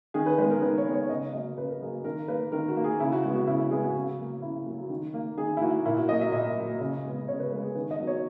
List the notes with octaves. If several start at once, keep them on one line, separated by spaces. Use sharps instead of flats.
D#3 G#4
B4
G#3 B3 B4
A#4
D#3 B4
C#5
G#3 B3
C#5
C#3 D#5
F#3 A#3 D#5
C#3 B4
A#4
F#3 A#3 G#4
D#3 A#4
A#3 B4
D#3 A#4
F#4
A#3
G#4
C#3 E4
F#4
G#3 B3 F#4
F#4
C#3 E4
F#4
G#3 B3 G#4
F#4
C#3 F#4
F#3 A#3
C#3 E4
F#3 A#3 F#4
D#3
A#3
D#3 G#4
E4
A#3 F#4
A#2 E4
F#4
F#3 A#3 D#5
E5
A#2 D#5
F#3 A#3
C#3 D#5
G#3 B3
C#3 C#5
B4
G#3 B3 B4
G#4
D#3 B4
D#5
F#3 B3
C#5